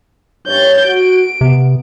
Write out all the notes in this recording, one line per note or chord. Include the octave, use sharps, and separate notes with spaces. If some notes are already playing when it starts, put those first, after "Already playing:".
G2 C#5 G6 A6
F#4 D7
C3 B3